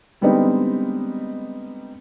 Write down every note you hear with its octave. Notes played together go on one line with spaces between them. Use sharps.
D3 G3 G#3 B3 C4 D#4